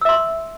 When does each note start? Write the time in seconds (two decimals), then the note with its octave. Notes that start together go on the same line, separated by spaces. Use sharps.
0.01 E6
0.05 E5
0.09 C6